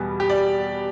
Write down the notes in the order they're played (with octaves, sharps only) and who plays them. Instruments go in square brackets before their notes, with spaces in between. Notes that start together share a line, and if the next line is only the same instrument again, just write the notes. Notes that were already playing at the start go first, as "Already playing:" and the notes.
Already playing: [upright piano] E2 B2 G3 B3
[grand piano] G4
D5